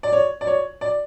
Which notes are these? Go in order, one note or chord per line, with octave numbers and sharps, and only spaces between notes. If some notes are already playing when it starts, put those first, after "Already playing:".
D5
C#5
D5
C#5
D5